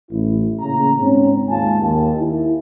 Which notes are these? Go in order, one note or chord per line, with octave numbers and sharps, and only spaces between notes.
A1 E4
A#2 C#3 A#5
G#2 C4 C#4
D#2 G#2 G#3 F4 G#5 A5
D#2
E4